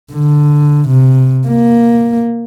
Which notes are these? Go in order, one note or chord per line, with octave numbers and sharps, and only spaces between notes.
D3
C3
A#3